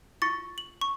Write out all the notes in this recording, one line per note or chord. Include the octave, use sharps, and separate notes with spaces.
F4 C#6 A6 C#7
F#7
C#6